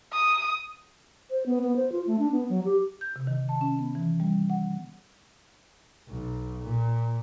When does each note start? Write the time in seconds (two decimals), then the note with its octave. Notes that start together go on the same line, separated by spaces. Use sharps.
0.13 D#6
1.31 C5
1.46 B3
1.63 B3
1.76 C5
1.92 F4
2.07 A3
2.19 D4
2.32 B3
2.49 F#3
2.65 G4
3.01 G6
3.16 C3
3.27 D#3
3.49 A5
3.61 C#4
3.79 B3
3.95 E3
4.20 G3
4.50 F#5
6.08 B1
6.64 A#2